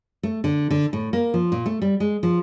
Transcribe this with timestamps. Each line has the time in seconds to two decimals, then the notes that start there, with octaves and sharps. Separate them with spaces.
0.23 A3
0.44 D3
0.71 D3
0.93 A2
1.13 A#3
1.34 F3
1.52 A#2
1.66 A3
1.82 G3
2.00 G#3
2.23 F3